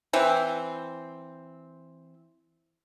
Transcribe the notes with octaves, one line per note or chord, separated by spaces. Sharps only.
E3 C4